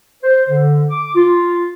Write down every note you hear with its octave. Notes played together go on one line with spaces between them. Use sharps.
C5
D3
D6
F4